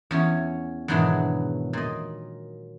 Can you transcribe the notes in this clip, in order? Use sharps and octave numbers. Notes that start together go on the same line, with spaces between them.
E2 C#4 C#5
E2 G#2 B2 D#3 F#3 D4
A#2 D#5